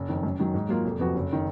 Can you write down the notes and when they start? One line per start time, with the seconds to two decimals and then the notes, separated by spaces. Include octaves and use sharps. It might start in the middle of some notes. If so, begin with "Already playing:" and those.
Already playing: F#1
0.09 F2 D#3
0.23 F#2
0.39 D#3 F#3
0.54 G#2
0.69 F#3 A#3 F4
0.85 F1
0.99 F2 F3 B3 F#4
1.14 F#1
1.33 D#3